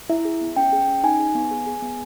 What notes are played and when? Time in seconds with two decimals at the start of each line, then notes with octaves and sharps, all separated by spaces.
0.09 E4 E5
0.25 G#4
0.41 B3
0.56 C#4 G5
0.73 G#4
0.88 C#4
1.04 D#4 G#5
1.19 G#4
1.35 B3
1.51 G#4
1.67 G#4
1.82 B3